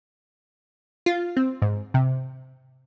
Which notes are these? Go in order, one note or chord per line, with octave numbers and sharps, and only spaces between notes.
F4
C4
G#2
C3